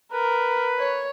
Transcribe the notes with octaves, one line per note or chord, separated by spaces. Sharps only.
A#4 B4
C#5